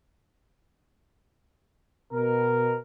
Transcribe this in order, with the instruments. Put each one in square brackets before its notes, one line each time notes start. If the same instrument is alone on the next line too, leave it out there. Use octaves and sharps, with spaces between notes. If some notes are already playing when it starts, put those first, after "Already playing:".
[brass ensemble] B2 A#4